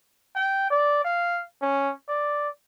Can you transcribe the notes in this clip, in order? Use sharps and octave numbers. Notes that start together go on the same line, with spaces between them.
G5
D5
F5
C#4
D5